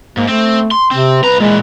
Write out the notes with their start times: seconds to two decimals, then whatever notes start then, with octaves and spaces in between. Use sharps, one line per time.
0.17 G#2 A#3
0.28 A3 C4
0.71 C6
0.91 C3 C4
1.23 C2 B4 A#5
1.40 A#2 E3 G#3